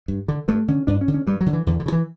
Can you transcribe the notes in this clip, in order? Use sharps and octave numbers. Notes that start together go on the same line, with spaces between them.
G2
D3
G2 A3
D3 C#4
G2 D4
C#4
D3
C#4
G2 G3
F#3
D3
E3
E2 D3
D3
C#3
E3